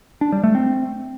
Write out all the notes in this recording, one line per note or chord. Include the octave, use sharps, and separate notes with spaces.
D4
G3
A3
C4